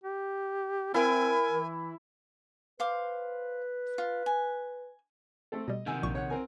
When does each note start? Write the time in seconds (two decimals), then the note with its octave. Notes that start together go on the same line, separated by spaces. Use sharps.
0.04 G4
0.94 C4 E4 A#4 G#5
1.48 E3
2.80 B4 C5 F5 D6
3.98 F4
4.26 G#5
5.52 A3 C4 A4
5.68 B2 G3 D#5
5.86 C3 D#3 F#5 G#5 E6
6.02 A#1 A#2 C#6
6.15 C#5 F#5
6.30 C4 A#4 G#5